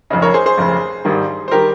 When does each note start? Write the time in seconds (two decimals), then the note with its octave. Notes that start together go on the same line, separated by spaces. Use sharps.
0.10 F1 F2 C#3 D#4
0.22 A#4 C#5
0.34 G#4 C5
0.46 G#4 C5
0.58 F1 F2 C#3
1.05 G#1 G2 D#3 G3
1.48 C5
1.51 D#3 G3 G4 A#4